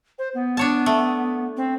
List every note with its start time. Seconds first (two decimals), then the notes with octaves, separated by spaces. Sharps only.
0.19 C5
0.35 B3
0.57 D4 C#5 A5
0.86 A3
1.57 C4